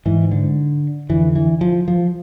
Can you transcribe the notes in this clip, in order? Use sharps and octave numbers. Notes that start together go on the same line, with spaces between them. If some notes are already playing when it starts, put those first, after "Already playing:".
G#2 E3
D3
F2 D3 E3
E3
F3
F3